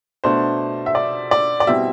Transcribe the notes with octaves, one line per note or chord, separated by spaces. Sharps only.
B2 A3 D4 C5
E5
D5
D5
D5
B2 G3 C4 E4 E5